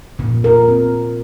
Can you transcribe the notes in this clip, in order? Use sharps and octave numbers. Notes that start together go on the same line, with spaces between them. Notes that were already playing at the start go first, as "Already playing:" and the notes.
A#2
A#4
C4